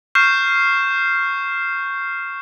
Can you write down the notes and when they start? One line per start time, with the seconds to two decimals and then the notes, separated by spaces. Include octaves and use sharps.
0.15 C#6 F6 G6 C7 E7